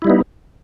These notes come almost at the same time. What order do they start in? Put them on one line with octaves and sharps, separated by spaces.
E4 G3 D#4 B3